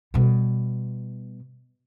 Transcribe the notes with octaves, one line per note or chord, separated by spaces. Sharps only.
B2 G3